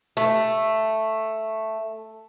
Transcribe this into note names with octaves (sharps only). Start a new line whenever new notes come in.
A3